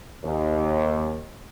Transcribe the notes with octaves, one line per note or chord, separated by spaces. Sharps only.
D#2